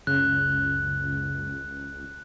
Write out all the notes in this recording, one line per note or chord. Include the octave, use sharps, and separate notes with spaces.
F#1 C#2 C#3 F#6